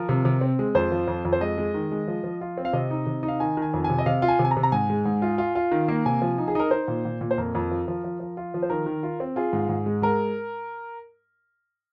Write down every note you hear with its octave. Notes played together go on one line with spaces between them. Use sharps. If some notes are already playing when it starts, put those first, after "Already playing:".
Already playing: F3 A#4
C3
C3
C4
G#3
F2 C5
F3
F2
F2
C5
G#3 D#5
G#3
D#3
G#3
F3
F3
F4
C4
F5
C3 D#5
D#4
C3
D#4
F5
D#3 G#5
D#3
G#5
F2
G#5
C3
D#5
C3 F5
F4
G#5
C3
G#5
A#5
C3
A#5
G#2 G#5
G#3
G#2
F4
F4
F4
D#3
A#3
C3 G#5
F3
D#4
G#4
D#4 A#4
D#4 C5
A#2
A#2
A#2
C5
F2 A#4
F2
F3
F3
F3
F3
F4
F3
C5
D#3 A#4
D#3
F4
C4
F4 G#4
G#2
G#2
G#3
G#3 A#4